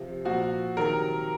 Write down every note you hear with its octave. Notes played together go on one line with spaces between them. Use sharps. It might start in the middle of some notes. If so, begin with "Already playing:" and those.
Already playing: C3 F3
A#2 F3 F#4
C3 D#3 F#3 A#4